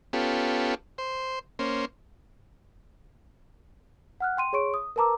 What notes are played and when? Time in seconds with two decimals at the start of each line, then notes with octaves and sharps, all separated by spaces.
0.13 B3 C#4 F4 G4 A4
0.98 C5
1.59 A#3 C#4 C5
4.20 F#5 F6 F#6
4.37 G5 C6 D#7
4.53 G#4 C#5 C6 C#6 D7
4.74 D#6
4.96 A#4 B4 A5 A#5 D6 E6